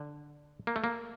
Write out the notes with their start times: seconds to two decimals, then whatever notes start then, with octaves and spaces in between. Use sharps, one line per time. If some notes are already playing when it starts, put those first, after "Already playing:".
Already playing: D3
0.67 A#3
0.76 A3
0.84 A#3